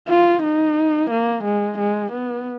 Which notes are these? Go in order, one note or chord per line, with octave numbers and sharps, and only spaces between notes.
F4
D#4
A#3
G#3
G#3
B3